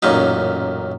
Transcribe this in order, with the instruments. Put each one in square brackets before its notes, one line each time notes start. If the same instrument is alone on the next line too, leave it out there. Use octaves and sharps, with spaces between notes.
[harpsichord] A1 F#2 A#2 D#4